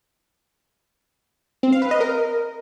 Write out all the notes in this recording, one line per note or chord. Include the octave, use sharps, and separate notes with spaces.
C4
F5
B4
D#5
A#4